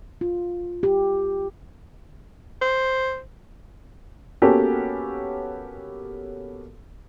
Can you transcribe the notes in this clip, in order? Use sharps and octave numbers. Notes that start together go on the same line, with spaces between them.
F4
G4
C5
A#3 B3 C#4 F#4 G4 A4